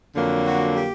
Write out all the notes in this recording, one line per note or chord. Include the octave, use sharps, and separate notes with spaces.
F2 D3 F#3 A#3
F#4
G4